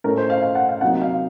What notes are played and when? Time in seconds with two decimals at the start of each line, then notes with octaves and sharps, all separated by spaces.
0.04 A2 A3 C#4 A#4
0.17 C5
0.30 F5
0.43 F5
0.55 F#5
0.69 F5
0.81 C3 F#3 A#3 D#4 F#5
1.02 F5